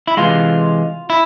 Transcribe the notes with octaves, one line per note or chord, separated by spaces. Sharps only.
E4
C3 E3 G#3 F4
E4